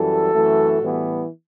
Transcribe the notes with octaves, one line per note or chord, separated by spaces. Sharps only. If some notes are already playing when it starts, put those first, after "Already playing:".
Already playing: F#2 E3 G3 F#4 A4
F#2 E3 A3
A2 E3 G3 B3